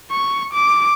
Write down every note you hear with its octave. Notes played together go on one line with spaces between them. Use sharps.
C#6
D6